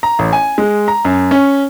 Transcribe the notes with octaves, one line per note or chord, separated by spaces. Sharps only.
A#5
A1
G#5
G#3
A#5
F#2
C#4